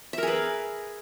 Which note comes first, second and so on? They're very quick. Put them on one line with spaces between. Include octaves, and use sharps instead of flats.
E5 A#4 G#4 B4